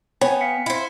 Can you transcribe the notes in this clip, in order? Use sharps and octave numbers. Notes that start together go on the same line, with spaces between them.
B3 C#5 G5 G#5
F5 B6 C#7
E4 C5